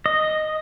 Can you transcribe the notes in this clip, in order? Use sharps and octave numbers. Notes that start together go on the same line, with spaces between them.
D#5